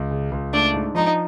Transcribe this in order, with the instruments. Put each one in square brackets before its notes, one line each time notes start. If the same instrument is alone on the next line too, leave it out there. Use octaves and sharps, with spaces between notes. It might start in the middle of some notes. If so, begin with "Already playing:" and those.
Already playing: [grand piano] C#2
C#3
C#2
[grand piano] A3 [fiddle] D4
[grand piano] G#2
[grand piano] F3 [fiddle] D#4